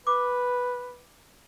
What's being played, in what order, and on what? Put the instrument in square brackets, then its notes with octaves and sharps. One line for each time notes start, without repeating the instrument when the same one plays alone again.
[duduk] B4 [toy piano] D6